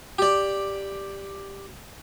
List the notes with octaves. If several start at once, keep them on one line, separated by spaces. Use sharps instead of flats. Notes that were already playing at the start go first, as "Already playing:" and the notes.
G4 D5